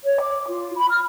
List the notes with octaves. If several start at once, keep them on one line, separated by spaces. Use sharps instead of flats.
C#5
D6
F4
B5
F6